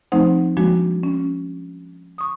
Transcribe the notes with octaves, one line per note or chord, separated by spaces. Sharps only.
F3 A3 C4 D#4 C5 F#5
F3 G3 G#3 A#3 D4 F#4
C#4
C#6 D#6